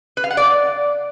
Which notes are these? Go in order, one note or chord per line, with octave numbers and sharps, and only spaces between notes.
B4
F5
F#5
D5